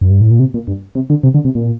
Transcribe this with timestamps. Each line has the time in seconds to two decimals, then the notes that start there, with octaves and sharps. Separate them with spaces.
0.01 F#2
0.10 G2
0.21 A2
0.31 A#2
0.39 C3
0.54 A#2
0.67 G2
0.95 C3
1.10 D3
1.23 C3
1.34 D3
1.45 C3
1.55 A#2